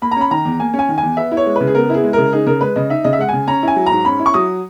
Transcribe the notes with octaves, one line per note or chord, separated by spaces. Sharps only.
A#3 B5
A#5
C#4 B5
D#3 A#5
E2
A#3 G#5
C#4
G#5
D#3
G#5
E2
B3 E5
E4
C#5
G#3
C#3 B4
G#4
B3 A#4
E4 G#4
G#3
C#3 A#4
D#4 G#4
C#3 A#4
G#3 B4
C#3 D#5
D#4 E5
C#3 D#5
E5
G#3 F#5
C#3 G#5
C#4 A#5
E4 G#5
F#3
G#2 A#5
C#4 B5
E4
C#6
F#3 D#6